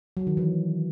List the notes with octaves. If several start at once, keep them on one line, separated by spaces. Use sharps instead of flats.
F#3
D#3
E3